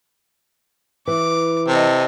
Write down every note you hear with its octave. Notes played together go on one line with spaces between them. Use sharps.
E3 D6
C3 A4 D#5